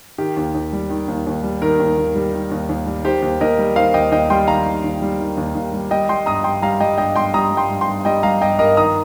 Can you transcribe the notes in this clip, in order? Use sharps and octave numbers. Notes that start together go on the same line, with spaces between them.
D#3 G4
D#2
D#2
G3
D#3
D#2
D#2
G3
D#3 A#4
D#2
D#2
G3
D#3
D#2
D#2
G3
D#3 G4 C5
D#2
D#2 A#4 D#5
G3
D#3 C5 F5
D#2 D#5 G5
D#2 D#5 G5
G3 G5 C6
D#3 F5 A#5
D#2
D#2
G3
D#3
D#2
D#2
G3
G3 D#5 G5
G3 G5 C6
G2 A#5 D#6
G2 G5 C6
G3 F5 A#5
G3 D#5 G5
G2 D#5 G5
G2 G5 C6
G3 A#5 D#6
G3
G5 C6
G2
G5 C6
G2
G3 D#5 G5
G3 F5 A#5
G2 D#5 G5
G2 A#4 D#5
D#3 A#5 D#6